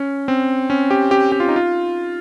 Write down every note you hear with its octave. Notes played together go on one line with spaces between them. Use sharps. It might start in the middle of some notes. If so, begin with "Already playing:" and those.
Already playing: C#4
C4
C#4
G4
G4
G4
F4
D#4
F4